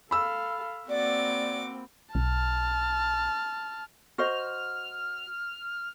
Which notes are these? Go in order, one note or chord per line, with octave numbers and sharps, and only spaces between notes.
A4 F5 B5 E6
A#3 C4 F#4 D5 D6
B1 A5 F6
F#4 C5 D#5 F6